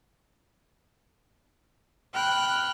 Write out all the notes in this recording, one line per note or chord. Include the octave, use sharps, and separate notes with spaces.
G5 B5 F6 F#6